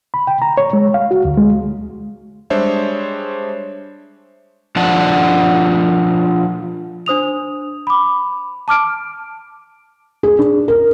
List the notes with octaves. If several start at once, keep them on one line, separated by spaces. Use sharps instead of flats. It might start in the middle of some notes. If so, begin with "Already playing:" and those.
B5
G5
A#5
C#5
G#3
F5
F#4
D2
G#3
G3 G#3 D4 C5 C#5 E5
F3 D4 F4 D5 F#5 A5
D4 C5 D#6 F7
B5 D6
A5 D6 F6 D7
G#4
D4
A#4